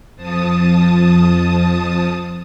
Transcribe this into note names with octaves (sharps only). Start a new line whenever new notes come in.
F2 F3 A5 D#6